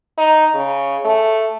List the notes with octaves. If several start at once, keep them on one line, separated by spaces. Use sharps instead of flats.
D#4
C#3
A3